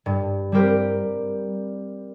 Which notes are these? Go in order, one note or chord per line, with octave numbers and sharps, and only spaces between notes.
G2
G3 C4 G4 A#4